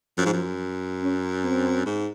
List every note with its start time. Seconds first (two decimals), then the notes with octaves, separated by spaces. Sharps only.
0.18 F#2 F3
0.26 G#2
0.33 F#2
1.02 C#4
1.45 C4
1.86 G#2